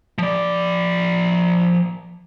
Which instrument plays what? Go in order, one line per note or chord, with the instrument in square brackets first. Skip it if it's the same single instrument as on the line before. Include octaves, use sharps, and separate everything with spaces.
[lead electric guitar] F3 D5